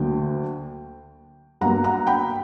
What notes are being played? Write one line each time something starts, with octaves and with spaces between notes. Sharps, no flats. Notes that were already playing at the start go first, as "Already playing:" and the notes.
Already playing: D2 D3 F#3 A#3 G5
G2 F#3 A#3 F#5 A#5
F#5 A#5
G5 B5